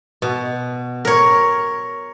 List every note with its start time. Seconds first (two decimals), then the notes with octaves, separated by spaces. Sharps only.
0.22 B2
1.05 A#4 C#5